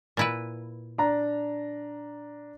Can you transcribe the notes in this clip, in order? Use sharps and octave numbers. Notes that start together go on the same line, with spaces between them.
A#2 E4 B4
D4 A#5